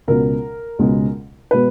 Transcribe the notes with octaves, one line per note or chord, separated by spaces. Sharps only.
C#2 B2 G#3 A#4
C#2 B2 G#3
B2 G#3 B4